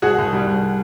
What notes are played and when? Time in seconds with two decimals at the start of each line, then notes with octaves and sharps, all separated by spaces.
0.02 C2 F#4 G#4
0.18 C2
0.32 G3
0.47 C2